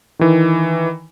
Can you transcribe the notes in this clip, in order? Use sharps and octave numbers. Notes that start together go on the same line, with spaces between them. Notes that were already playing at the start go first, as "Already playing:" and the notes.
D#3 E3